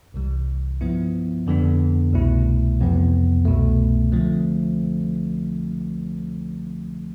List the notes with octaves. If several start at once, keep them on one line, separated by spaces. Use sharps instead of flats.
C2 C3 E3 G3
G2 F3 B3 E4
F2 D3 G3 B3 D4
C2 B2 A3 E4
F2 C3 E3 B3
C2 B2 A3
D3 F3 A3 C4